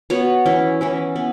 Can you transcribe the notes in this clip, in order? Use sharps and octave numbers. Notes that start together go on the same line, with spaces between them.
B3 F#4 C#5
E3 C#4 E4
E3 C#4 E4
B3